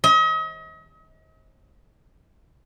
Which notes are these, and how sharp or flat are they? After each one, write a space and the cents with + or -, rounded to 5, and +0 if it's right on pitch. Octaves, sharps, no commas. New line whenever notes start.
D#5 +40